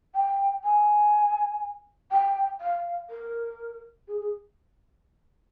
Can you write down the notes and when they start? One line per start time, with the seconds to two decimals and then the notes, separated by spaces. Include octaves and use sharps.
0.15 G5
0.64 G#5
2.12 G5
2.61 F5
3.10 A#4
4.08 G#4
4.21 G#4